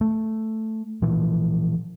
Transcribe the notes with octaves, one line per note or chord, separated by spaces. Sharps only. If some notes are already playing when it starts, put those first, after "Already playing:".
A3
A#2 E3 F3